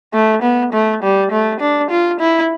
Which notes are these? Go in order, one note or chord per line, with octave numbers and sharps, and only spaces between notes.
A3
B3
A3
G3
A3
D4
F4
E4